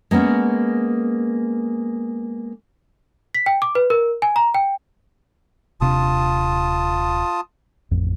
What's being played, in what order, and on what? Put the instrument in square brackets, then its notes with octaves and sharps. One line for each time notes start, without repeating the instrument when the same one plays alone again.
[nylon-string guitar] G#3 A#3 B3 C#4
[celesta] B6
G5
D6
B4
A#4
G#5
A#5
G5
[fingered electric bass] D#1 C3 D4 [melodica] F4 A5 D#6
[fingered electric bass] A1 F2